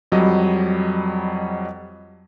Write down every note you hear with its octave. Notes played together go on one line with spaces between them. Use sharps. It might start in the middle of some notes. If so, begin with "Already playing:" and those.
F2 F#3 G3 D#5